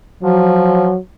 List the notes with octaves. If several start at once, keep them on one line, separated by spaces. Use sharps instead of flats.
F3 F#3